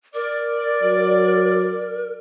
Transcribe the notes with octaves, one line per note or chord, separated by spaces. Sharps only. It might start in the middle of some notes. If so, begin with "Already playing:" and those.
A#4 D5
F#3